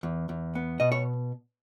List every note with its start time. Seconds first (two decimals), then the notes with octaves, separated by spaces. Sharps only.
0.03 E2
0.29 E2
0.55 B3
0.80 B2 D#5
0.92 C#5